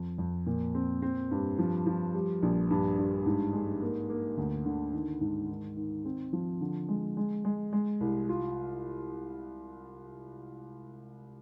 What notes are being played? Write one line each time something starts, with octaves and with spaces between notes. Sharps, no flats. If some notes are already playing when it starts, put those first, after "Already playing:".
Already playing: F2
F2
A#2
C4
C4
G2
F3
F3
G3
A#1
G2
G2
G#2
G#3
A#3
A#3
D2
D3
D#3
G#2
D#3
D#3
C4
F3
D3
G#3
G#3
G#3
G#3
C2
F4